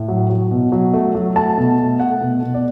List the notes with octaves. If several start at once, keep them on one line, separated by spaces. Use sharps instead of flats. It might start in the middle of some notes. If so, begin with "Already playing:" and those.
Already playing: A2
F#3
F#3
B2
F#3
A3
F#3
A3 A5
B2
A3
A3 F#5
B2
B2
D5